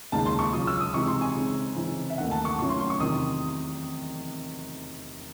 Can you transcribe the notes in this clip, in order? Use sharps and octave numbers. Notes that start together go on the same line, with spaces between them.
D#2 C#3 G#3 D#4 A5
C6
C#6
C#2 C#3 F#3 D#6
E6
D#6
C3 E3 G#3 D#4 C#6
C6
G#5
C#3 G#3 C4 D#4
C#3 E3 C4 D#4
E5
D#2 D#3 A3 D#4 F#5
A5
C#6
A2 F#3 C#4 E4 C#6
C6
C6
C#6
E2 C3 D#3 D#6